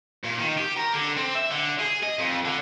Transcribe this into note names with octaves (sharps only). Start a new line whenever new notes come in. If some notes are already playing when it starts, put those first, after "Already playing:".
A#2
D#3
G4
A#4
D3
C4
E5
D3
G#4
D#5
F2
D3